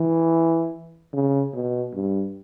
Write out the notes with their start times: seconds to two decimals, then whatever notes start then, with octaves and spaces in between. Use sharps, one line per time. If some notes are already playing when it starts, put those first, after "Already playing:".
Already playing: E3
1.13 C#3
1.54 B2
1.95 G2